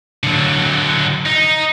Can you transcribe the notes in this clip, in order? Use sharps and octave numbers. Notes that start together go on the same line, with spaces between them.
D3 F#3
D#4